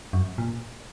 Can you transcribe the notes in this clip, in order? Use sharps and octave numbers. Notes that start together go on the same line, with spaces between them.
F#2
A#2